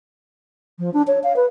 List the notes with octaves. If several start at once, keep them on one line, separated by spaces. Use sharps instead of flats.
F3
D4
C#5
F5
B4